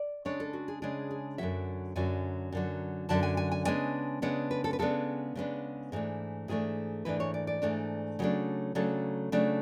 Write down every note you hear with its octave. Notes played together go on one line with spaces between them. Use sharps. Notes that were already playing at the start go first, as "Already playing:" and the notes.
Already playing: D5
C#3 G#3 D4 C#5
A4
F#4
G#4
C#3 G#3 D4 G#4
G#4
F#2 D3 F#3 E5
F#2 D3 F#3 G#5
F#2 D3 F#3
F#2 D3 F#3 A5
G#5
G#5
G#5
C#3 G#3 B3 D4 G#5
C#3 G#3 B3 D4 F#5
B4
A4
B4
C#3 G#3 B3 D4 A4
C#3 G#3 B3 D4
G#2 E3 A3 D4
G#2 E3 A3 D4 G#4
G#2 E3 A3 D4 B4
C#5
D5
D5
G#2 E3 A3 D4
C#3 F#3 A3 D4
C#3 F#3 A3 D4 A4
C#3 F#3 A3 D4